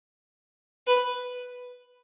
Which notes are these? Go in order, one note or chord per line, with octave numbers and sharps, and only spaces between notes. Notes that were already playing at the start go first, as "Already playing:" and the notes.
B4